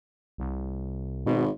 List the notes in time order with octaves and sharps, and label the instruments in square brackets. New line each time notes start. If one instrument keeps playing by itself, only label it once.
[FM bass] C2
[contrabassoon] G#1 [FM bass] B2